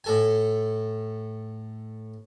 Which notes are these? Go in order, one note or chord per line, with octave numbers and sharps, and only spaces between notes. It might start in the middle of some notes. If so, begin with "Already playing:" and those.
A2 A4 G#5